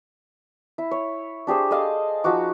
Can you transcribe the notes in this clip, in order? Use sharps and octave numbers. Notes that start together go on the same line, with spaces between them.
E4
C#5
D4 G4 G#4 C5
G#4 A4 D#5 F5
F3 D#4 F#4 D6